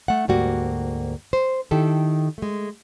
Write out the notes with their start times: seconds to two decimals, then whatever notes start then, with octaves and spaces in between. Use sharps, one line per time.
0.08 A3 F#5
0.28 D2 G#2 G3 A#3 F#4 G4
1.33 C5
1.71 D#3 E4 G4 A4
2.38 G#3 A3